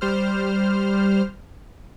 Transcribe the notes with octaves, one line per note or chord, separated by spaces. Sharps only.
G3 C5 F6